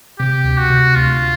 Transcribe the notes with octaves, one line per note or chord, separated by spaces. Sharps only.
C3 G4
D2
F#4
C3
D2 F4